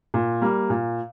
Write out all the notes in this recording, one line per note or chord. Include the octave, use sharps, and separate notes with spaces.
A#2
G3 A#3
A#2